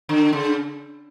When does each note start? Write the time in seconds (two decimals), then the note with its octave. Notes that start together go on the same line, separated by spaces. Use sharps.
0.09 D3
0.33 C#3